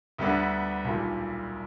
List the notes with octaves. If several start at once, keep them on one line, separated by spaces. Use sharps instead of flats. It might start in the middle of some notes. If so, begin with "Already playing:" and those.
D2 D3 G3 B3 D4
B1 A#2 G3